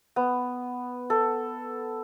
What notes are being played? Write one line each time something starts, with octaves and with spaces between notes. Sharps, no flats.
B3
A4